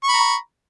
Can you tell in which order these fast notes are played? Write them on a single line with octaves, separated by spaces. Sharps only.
C#6 B5 A#5